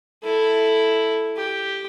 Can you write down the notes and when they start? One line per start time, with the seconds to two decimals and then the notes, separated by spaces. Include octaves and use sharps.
0.24 E4 A4
1.36 G4